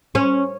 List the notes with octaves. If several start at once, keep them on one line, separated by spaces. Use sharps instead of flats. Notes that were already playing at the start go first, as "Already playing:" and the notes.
C#4